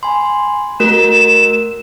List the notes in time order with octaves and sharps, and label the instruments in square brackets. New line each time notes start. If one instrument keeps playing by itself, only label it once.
[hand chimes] G#5 B5 C6
[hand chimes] A3 F#4 A#4 [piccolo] E7